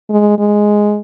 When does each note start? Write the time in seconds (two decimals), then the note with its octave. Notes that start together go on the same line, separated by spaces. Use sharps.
0.10 G#3
0.39 G#3